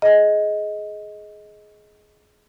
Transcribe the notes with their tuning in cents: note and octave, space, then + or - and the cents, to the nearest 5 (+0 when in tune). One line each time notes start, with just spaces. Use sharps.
G#4 +20 D#5 +10